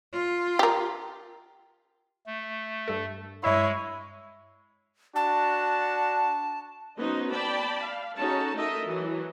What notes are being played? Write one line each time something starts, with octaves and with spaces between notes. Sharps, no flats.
F4
G4 A#4
A3
G2 A4
G2 G#3 E4 C#5 D#5 E5
D4 F#4 A5
F#3 B3 C#4 D#4 C5 D#5
D5 G5 A5 B5
F5
C#4 D#4 F#4 G#4 A4 A5
A3 D#4 A4 A#4 D#5 E5
E3 F#3